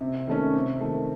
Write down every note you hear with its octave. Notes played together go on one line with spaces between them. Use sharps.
C3
D#3 A3 C#4
C3
D#3 A3